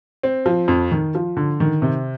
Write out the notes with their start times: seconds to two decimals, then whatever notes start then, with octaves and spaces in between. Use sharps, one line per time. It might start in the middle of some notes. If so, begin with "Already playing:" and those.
0.23 C4
0.46 F3
0.68 F2
0.92 D#3
1.15 F3
1.37 D3
1.60 D#3
1.82 C3